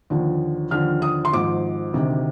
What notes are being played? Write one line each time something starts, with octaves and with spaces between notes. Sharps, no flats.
D#2 D3 F3
D#2 D3 F3 F6
D#6
C6
G#1 G#2 F3 D6
D2 C3 D#3